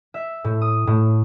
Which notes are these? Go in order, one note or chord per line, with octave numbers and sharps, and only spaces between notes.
E5
A2
D#6
A2